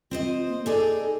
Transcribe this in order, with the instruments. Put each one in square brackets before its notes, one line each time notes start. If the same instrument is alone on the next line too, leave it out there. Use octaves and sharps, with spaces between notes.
[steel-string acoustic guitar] C4 C5 D#5 [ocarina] F4
[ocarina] A#3
[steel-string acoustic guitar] D#4 G#4 D5 [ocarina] A4